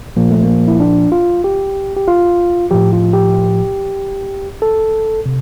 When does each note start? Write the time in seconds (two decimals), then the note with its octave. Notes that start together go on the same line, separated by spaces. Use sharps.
0.17 A#2 F3 A#3
0.31 A3
0.43 A#3
0.68 E4
0.80 D4
1.12 F4
1.44 G4
1.97 G4
2.08 F4
2.71 A2 F3 G4
2.93 F4
3.13 G4
4.62 A4
5.26 C3